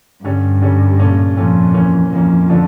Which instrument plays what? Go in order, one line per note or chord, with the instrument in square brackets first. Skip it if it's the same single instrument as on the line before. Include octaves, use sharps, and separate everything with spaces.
[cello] G2 [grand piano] D3 G3 C#4
[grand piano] D3 G3 C#4
A#2 A3 C#4
[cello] F2 [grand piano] A#2 A3 C#4
[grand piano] E3 A#3 C#4
[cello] F2 [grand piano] E3 A#3 C#4
[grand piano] D3 F3 A3 D4